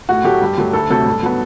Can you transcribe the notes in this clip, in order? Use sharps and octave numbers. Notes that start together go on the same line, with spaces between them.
A2 F#4
F#3 A3 G4
G2
F#3 A3
D2 A4
C3 F#3 A3 A4
G2
F#3 B3